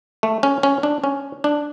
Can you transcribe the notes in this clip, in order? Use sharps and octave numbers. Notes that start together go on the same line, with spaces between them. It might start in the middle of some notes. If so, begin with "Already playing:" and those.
A3
C#4
C#4
D4
C#4
D4